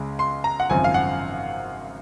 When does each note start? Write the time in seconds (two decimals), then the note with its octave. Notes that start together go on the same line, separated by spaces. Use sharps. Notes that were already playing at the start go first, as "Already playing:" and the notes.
Already playing: C#2 C#3 G#3
0.19 C6
0.44 A#5
0.60 F#5
0.70 G#1 F#2 C#3 F3 C4 G#5
0.84 F5
0.94 F#5